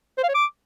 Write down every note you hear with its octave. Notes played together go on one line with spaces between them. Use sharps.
C5
F5
C#5
D6